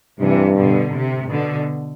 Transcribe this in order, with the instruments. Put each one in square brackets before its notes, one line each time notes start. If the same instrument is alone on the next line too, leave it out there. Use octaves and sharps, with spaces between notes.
[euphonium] G2 [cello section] C3 E3
[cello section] B2 D3
C3
B2 D3